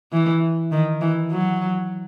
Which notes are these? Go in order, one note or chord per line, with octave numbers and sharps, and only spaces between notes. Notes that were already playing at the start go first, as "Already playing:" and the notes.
E3
D#3
E3
F#3